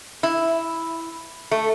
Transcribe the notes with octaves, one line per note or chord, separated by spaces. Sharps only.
E4
A3